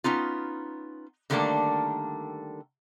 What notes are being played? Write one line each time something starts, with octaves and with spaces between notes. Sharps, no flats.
B3 C#4 D#4 F4
D3 D#3 G3 A3 A#3 D4